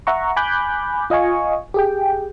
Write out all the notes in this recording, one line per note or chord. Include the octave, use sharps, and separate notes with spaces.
E5 F#5 A#5 C#6
G#5 B5 D6 F#6 G6
F4 D#5 F5 G#5 C#6
G4 G#4 G5